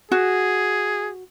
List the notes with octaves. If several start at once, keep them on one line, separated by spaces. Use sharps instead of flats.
F#4 G#4